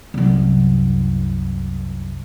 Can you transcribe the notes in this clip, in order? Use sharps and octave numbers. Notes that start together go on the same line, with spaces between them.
C2 F#2